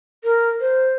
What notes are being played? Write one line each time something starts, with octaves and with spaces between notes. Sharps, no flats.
A#4
C5